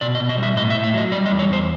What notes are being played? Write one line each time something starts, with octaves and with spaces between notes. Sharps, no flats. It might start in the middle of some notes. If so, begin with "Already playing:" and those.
B2 D5
D#5
B2
D#5
G3 E5
A2 D#5
E5
A2
E5
F#3 D#5
G3 D5
D#5
E2
C#5
E2 C5